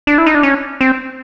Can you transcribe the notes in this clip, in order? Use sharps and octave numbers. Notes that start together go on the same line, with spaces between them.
D4
E4
D#4
D4
C#4
C4